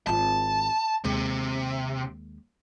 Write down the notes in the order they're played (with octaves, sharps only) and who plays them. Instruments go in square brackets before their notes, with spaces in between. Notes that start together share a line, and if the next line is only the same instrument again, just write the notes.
[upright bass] G#1 F4 [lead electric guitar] A5
[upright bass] D#2 G#3 [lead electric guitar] C3